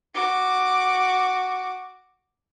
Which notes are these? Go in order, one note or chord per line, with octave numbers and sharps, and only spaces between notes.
F#4 D6